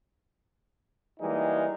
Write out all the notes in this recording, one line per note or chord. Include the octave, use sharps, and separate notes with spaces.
E3 G3 G#3 A#3 D#4